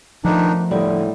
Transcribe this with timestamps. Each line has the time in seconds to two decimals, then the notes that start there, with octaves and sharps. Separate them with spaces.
0.25 D#3 F3 A3 B3 D4 D#4
0.71 A2 D3 G3 A#3 D#5